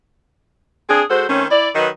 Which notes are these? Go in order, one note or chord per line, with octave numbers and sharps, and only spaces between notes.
C4 D4 G#4
G#3 F#4 A4 C5
D#3 A3 C4 C#4
E4 D5
D#3 F#3 D#4 B4 D#5